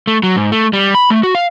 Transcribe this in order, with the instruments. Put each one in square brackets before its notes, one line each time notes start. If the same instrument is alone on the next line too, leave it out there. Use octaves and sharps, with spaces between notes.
[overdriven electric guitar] A3
F#3
G#2
A3
G3
B5
A3
F#4
F5